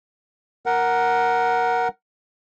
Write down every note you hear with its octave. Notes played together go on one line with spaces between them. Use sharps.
A#4 F#5